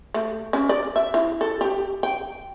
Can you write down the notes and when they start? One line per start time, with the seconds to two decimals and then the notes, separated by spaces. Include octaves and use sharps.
0.14 A3
0.53 C#4
0.69 D5
0.96 E5
1.14 E4
1.41 A4
1.61 G4
2.03 G5